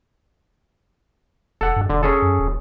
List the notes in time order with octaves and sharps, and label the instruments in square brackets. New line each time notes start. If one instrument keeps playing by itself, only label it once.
[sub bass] E1 [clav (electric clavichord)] A4 F#5
[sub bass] G2
[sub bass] E1 [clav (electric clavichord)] D3
[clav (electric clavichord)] C#4 G#4 A4
[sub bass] F#2
D#1